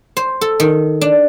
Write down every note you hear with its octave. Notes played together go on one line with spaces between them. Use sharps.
C5
A4
D#3
D4